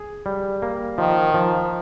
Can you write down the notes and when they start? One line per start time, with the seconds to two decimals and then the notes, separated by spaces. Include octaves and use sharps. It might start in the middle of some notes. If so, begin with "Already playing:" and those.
Already playing: G#4
0.26 G3
0.62 A#3
0.98 D#3 F3
1.34 F3